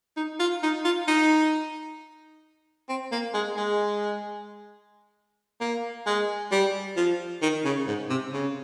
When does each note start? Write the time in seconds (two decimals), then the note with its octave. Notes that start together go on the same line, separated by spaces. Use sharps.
0.17 D#4
0.39 F4
0.63 D#4
0.85 F4
1.08 D#4
2.89 C4
3.12 A#3
3.34 G#3
3.57 G#3
5.61 A#3
6.06 G#3
6.52 G3
6.97 F3
7.42 D#3
7.65 C#3
7.87 G#2
8.10 C3
8.33 C#3